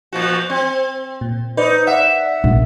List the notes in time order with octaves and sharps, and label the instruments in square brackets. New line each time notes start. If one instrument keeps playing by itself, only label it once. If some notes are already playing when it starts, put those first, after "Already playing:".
[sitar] A#2 F3 F#4
C4
[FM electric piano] A#2
[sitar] D#4 [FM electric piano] B4 C5 D5
[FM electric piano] D5 F#5 [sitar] E5
[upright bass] A#1